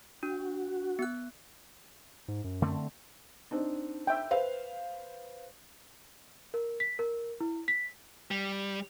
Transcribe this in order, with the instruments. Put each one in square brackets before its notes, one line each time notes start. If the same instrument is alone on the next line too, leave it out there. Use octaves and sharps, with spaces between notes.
[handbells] D4 [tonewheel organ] F#4
[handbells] B3 F#6
[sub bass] G#2
F#2
[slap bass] D3 A3 C4
[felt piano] C4 D4 D#4
[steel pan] E5 G5
[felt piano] B4 C5 F5
[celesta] A#4
B6
A#4
E4
B6
[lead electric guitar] G3